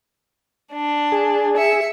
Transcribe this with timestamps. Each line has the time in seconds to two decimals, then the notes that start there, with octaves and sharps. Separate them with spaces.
0.73 D4
1.12 G#4
1.57 E5 C#7